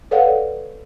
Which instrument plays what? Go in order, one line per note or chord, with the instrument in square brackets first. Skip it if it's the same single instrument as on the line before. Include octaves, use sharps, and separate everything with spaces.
[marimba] A4 B4 C#5 D5 F5 F#5